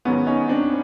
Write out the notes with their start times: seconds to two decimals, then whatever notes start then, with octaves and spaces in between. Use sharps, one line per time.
0.05 G#2 D#3 F#3 B3 C#4
0.27 C#4 D#4
0.48 C4 D4